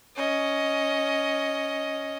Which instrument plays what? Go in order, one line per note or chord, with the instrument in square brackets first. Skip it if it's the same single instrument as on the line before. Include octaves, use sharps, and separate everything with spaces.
[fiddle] C#4 D#5